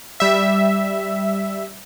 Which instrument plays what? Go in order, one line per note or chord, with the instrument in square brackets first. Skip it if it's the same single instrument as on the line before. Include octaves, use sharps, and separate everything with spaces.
[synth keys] G3 E5